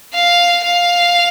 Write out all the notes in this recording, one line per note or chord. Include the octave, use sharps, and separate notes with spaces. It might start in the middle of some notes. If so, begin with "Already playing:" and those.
F5
F5